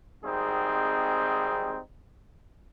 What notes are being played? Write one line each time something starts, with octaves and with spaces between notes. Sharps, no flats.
G#1 G3 C4 D#4 G#4